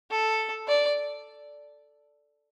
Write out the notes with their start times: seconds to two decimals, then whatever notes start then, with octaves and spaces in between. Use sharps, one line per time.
0.10 A4
0.68 D5